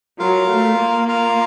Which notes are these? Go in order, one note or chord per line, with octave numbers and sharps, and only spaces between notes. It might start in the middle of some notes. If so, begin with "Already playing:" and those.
F#3 F4 A#4 F5
A3
A#3
F4 A#4 F5